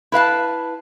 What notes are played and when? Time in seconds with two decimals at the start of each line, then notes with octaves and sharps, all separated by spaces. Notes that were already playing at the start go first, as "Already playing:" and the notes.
0.12 E4 B4 F5 A5